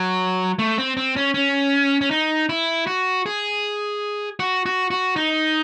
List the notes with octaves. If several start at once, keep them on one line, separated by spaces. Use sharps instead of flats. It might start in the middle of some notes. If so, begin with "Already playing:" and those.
Already playing: F#3
A3
C4
C4
C#4
C#4
C#4
D#4
E4
F#4
G#4
F#4
F#4
F#4
D#4